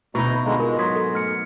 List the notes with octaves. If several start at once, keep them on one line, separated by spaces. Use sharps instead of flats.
D2 B2 D#4 E4 A#5 C#6
D3 G#3 F5 A#5 B5
G#3 F4 A#4
G#2 F#3 C6 D#6 G#6 B6
A4
A3 F6 C#7